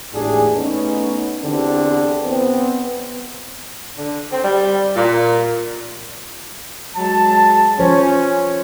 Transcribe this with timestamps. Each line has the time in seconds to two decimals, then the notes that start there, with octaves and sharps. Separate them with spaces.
0.13 G#1 E2 A2 D4 G4 G#4
0.56 A3 B3 C#4 D#4
1.43 E2 D3 C4 D4 G4
2.26 B3 C4
3.97 D3
4.32 C4
4.43 G3
4.96 A#2
6.96 F#3 G#3 A5
7.79 F3 C#4 C5 C#5